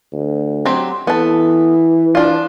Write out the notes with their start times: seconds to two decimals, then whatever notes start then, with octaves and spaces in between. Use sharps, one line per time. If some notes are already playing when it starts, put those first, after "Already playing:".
0.13 D2
0.65 F#3 C4 G4
1.07 E3 B3 A4
2.15 F3 D4 F4